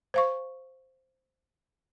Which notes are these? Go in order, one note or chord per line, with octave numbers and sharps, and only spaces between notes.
C5 F5 C#6